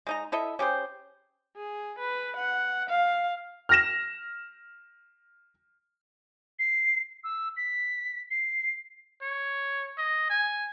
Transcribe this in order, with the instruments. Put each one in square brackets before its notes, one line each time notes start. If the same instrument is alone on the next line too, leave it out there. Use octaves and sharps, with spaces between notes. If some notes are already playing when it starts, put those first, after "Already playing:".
[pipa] G#3 D#4 A#5
E4 A4 D#5 E5
C#4 G4 G#4 C5
[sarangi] G#4
B4
F#5
F5
[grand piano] F6 A#6 E7
[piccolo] C7
E6
B6
C7
[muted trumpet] C#5
D#5
G#5